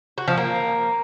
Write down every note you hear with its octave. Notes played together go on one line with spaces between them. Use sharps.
F#4
F3
A#3